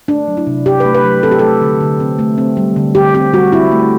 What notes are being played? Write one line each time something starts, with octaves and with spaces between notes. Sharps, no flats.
A3 D4
F#3
E4
C3
C3 G4
B4
A3
B4
F#3
C4 A4
G4
A3 A4
D3
D3
C4
A3
C4
G3
D3
D3 G4
C4 G4
G3 F#4
C4 E4
A3